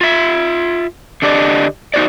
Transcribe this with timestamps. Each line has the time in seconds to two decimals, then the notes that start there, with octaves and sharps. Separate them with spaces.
0.01 F4 E5
1.22 D3 D4 G4 D5 D#5
1.94 D#4 F#4 C5 D5